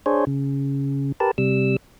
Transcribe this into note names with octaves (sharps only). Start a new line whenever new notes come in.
D4 G#4 C5 C#5
C#3
G4 A#4 B4 A5
C3 G3 E6